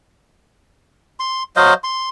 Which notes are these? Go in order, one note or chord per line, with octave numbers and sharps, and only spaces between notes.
C6
F#3 C5 D#5 F5
C6